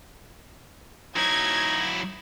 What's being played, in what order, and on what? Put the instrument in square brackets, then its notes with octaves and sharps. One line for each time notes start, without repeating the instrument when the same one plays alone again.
[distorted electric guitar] F#3 E4 [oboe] D#4 [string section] G#6